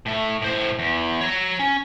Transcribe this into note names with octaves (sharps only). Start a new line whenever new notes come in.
A2 A3
A2 C5
E2
C#5 A#5
C#4